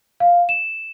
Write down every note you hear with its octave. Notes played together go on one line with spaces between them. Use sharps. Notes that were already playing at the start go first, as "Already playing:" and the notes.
F5
E7